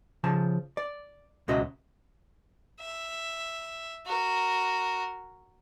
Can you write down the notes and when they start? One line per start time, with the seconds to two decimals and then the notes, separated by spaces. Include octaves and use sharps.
0.24 C#3 F3 A5
0.77 D5
1.48 C#2 B2 C#4 F#4 D#5 E5
2.80 E5
4.05 F#4 A#4